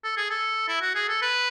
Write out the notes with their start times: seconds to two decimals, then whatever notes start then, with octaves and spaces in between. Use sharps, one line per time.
0.04 A4
0.17 G#4
0.30 A4
0.68 E4
0.81 F#4
0.95 G#4
1.08 A4
1.22 B4